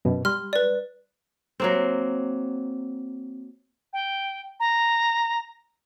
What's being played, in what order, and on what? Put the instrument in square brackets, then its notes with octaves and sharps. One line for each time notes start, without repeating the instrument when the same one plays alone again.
[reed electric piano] F#2 B2
[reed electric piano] G3 [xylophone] C6 F6
[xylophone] B4 D5
[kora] F#3 A#3 C4
[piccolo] G5
A#5